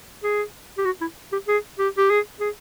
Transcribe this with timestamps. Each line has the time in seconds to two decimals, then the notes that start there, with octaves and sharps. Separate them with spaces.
0.24 G#4
0.78 G4
0.85 F#4
1.01 E4
1.32 G4
1.48 G#4
1.79 G4
1.98 G4
2.10 G#4
2.40 G#4